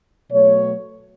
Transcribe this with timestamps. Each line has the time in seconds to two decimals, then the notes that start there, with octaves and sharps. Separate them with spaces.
0.30 B2 F#3 A3 C#5